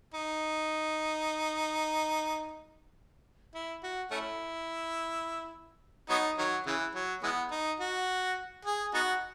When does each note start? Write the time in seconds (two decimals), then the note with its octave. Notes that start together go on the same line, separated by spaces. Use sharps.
0.14 D#4
3.54 E4
3.83 F#4
4.11 A3 C#4 E4
6.10 F#3 B3 D#4
6.38 D#3 F#3
6.66 C#3 E3
6.95 F#3
7.23 E3 G#3 B3
7.51 D#4
7.80 F#4
8.65 G#4
8.94 B3 D#4 F#4